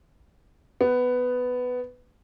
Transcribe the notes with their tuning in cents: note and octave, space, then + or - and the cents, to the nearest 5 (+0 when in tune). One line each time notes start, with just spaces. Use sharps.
B3 +10